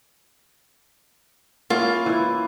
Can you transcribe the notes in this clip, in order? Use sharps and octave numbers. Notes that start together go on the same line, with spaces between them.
A#3 C#4 E4 F4
E3 E4